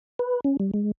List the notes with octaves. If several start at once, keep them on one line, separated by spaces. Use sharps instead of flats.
B4
C#4
G3
G#3